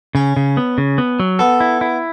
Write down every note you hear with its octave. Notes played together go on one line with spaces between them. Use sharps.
C#3 C#4
C#3
B3
C#3
B3
F#3
B3 A4
E4
E4